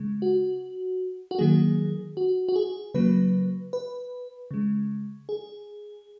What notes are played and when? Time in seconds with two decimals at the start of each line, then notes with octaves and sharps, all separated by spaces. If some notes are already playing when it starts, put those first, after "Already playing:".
Already playing: C#3 G#3
0.22 F#4
1.31 F#4
1.39 D#3 F#3 A#3 G#4
2.17 F#4
2.48 F#4
2.56 G#4
2.94 C#3 F#3 A#3 B4
3.73 B4
4.51 C#3 G#3
5.29 G#4